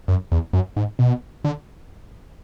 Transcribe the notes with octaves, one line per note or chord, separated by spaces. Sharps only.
F#2
E2
F#2
G#2
B2
D3